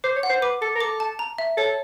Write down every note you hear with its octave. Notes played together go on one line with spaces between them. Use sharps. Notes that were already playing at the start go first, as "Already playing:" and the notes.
C5 D6
C#5
F#5
C5
B4 D6
A4 D6
A#4
A4 D6
A5
A#5
E5
A4 C#5